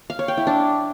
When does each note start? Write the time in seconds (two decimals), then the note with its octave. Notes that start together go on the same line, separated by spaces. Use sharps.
0.10 F5
0.19 C#5
0.28 G5
0.37 E4
0.47 D4